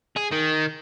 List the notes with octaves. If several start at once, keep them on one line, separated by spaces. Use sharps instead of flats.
G#4
D#3